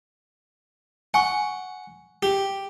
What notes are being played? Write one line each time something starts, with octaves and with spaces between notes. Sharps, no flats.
F#5 G#5 C#6
G4